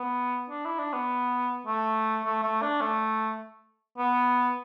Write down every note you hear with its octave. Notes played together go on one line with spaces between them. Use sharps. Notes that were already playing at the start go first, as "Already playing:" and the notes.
Already playing: B3
D4
E4
D4
B3
A3
A3
A3
D4
A3
B3